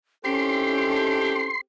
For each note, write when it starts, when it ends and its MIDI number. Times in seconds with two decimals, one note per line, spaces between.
0.25 1.59 60
0.25 1.43 61
0.25 1.54 63
0.25 1.54 64
0.25 1.59 67
0.25 1.54 69
0.25 1.61 84